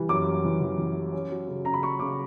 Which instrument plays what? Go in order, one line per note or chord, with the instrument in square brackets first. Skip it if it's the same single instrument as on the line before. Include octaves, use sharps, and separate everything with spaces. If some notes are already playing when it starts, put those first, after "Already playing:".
Already playing: [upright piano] E3 G3
F#2 D6
G3
E3
E3
E3
G3
C#4
F#3
C#3
C#3 A#5
B5
F#3 C#6
C#3 D6